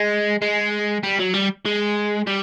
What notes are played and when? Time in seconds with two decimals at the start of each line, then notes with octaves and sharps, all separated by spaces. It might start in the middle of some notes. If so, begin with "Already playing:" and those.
Already playing: G#3
0.42 G#3
1.03 G3
1.19 F#3
1.34 G3
1.66 G#3
2.27 G3